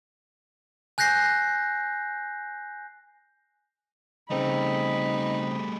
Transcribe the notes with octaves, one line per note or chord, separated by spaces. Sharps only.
G#5 F#6 G6 A#6 C7
C#3 G3 A3 C4 D#4 B5